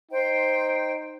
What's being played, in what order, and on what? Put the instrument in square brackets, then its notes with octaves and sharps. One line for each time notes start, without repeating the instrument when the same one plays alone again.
[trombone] D#4 [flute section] C5 G5